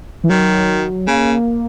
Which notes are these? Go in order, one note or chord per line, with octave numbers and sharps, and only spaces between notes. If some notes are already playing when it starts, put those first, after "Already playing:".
E3
D#3 F#3
C#3 A#3